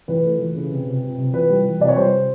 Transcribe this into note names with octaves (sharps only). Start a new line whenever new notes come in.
E3 B4
A3
E3
C#3
C3
C3
C3
C3
E3 B4
G3
E3
C3 D5
C#5
G3 C5